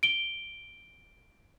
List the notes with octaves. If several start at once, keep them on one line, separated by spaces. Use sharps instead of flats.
D7 G7